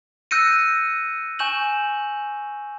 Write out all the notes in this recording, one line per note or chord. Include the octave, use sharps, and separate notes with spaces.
E6 F#6 G6 A#6 C#7 D#7
G#5 C#6 G6 E7 F#7